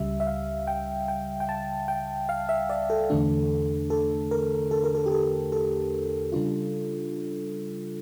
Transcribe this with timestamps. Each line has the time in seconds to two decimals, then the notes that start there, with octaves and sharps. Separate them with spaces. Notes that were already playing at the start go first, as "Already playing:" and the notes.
Already playing: C#2 C#3 G3 E5
0.20 E5
0.27 F5
0.67 G5
1.08 G5
1.40 G5
1.49 A5
1.88 G5
2.29 F5
2.49 E5
2.70 D5
2.90 A4
3.10 E2 D3 A3 D4
3.90 A4
4.31 A#4
4.71 A4
4.84 A#4
4.95 A4
5.06 G4
5.12 A4
5.52 A4
6.32 C#3 G3 D4 F4